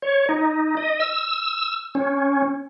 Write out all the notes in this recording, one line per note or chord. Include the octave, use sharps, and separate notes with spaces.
C#5
D#4
D#5
E6
C#4